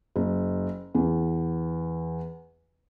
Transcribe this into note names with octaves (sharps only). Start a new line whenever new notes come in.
F#1
E2